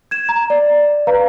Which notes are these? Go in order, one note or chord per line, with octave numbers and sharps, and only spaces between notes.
G#6 E7
A#5
D5
B4 F5 A#5